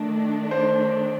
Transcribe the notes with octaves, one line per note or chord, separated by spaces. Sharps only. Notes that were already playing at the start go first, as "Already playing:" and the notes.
Already playing: D#3 A3 D4
C5